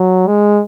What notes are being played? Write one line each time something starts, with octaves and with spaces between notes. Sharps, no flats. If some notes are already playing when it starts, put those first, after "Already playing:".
Already playing: F#3
G#3